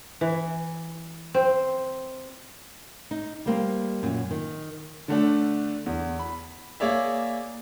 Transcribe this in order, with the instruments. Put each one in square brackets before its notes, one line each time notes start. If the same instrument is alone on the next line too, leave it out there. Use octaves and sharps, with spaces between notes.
[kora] E3
C4
[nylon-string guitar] D#4
G3 A#3 C4
F#2 A#2
D#3
[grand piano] D3 A3 D4
E2
B5
A#3 G#4 C#5 D5 E5